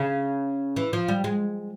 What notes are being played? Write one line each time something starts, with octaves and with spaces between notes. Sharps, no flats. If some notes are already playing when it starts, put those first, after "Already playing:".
Already playing: C#3
E3
F3
G3
G#3